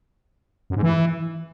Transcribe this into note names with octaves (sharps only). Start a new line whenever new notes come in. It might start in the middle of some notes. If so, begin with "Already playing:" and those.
F#2
G#2
E3